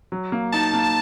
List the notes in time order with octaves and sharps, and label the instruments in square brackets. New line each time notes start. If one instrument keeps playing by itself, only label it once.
[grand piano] F#3
A#3
[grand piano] D#4 [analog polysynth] A5
[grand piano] A#3